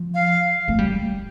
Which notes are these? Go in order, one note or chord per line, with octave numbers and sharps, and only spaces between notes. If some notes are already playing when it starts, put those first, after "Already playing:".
Already playing: F3
F5
A3
G3